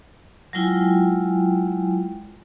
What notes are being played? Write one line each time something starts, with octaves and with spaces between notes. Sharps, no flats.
F#3 G#3 E4 F4 G5 G#5